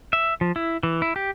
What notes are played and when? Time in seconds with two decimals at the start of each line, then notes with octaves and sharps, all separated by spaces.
0.13 E5
0.41 F3
0.56 E4
0.83 E3
1.02 E4
1.16 G4